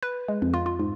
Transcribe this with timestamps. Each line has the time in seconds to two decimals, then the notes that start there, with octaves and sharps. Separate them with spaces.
0.03 B4
0.28 G#3
0.42 F2
0.54 F4
0.66 F4
0.80 G#2